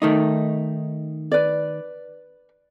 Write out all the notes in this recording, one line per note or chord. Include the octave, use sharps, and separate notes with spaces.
D#3 A3 D#4
B4 D5